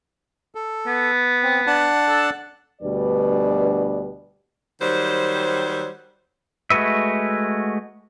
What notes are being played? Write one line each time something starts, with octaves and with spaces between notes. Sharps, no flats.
A4
B3
C4
D4 F#5 A5
A4
D2 B2 G3 D4 B4 D5
D#3 F#3 G3 C5
G#3 A3 F#4 B4 E5